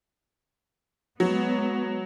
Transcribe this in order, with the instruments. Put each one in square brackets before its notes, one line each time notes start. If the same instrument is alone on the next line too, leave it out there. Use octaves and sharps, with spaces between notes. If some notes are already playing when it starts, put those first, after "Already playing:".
[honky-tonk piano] F#3 [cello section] G#3 B3